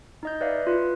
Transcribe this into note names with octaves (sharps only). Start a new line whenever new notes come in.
D#4 D#5 G6
B4 D5 E5 F5
F4 B4